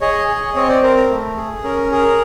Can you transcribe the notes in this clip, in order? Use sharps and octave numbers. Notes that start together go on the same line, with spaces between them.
G#4 C#5 D#5
G#4
C4 C#5 D#5
C5 D5
C4 A#4 C5
A#4
A3
G#4
C#4 A#4
G#4 A#4